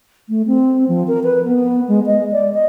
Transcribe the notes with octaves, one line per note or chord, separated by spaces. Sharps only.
A3
C4
F3
A#4
B4
B3
G#3
D#5
D5
D#5